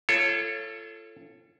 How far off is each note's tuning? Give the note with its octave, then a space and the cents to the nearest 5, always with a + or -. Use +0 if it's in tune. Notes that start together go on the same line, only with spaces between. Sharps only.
F4 -35 A4 +5 C#5 -10